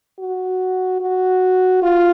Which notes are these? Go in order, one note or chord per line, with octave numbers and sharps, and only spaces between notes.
F#4
F#4
F4